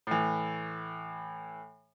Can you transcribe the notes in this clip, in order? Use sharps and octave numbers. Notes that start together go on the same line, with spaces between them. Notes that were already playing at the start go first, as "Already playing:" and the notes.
A2 E3